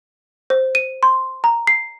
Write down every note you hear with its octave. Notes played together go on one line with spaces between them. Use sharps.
C5
D#7
C6
A#5
C7